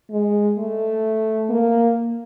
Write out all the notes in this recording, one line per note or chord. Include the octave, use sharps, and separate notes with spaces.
G#3
A3
A#3